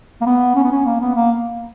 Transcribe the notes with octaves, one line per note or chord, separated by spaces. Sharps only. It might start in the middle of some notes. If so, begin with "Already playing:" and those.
A#3
B3
C#4
B3
C#4
A#3
B3
A#3